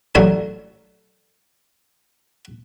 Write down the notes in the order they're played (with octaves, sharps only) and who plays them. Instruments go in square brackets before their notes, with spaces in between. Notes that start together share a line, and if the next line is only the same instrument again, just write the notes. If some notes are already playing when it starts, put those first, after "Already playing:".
[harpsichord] A1 F#3 A3 D4 E4 A#4